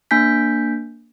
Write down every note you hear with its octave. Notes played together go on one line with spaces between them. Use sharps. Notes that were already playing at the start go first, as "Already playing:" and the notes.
A#3 D4 G#5 G6 B6